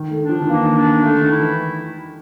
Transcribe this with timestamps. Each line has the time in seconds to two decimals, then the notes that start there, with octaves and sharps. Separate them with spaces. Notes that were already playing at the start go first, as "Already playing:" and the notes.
Already playing: D#3
0.11 A3
0.20 D4
0.29 F3
0.41 D#3
0.47 E3 A#3
0.66 D#3
0.76 D4
0.85 D#3
1.03 D3 A3
1.21 D#3
1.31 E4
1.39 E3